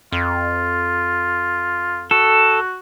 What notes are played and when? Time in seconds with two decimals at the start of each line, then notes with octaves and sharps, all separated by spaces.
0.12 F2 F4
2.11 F#4 A4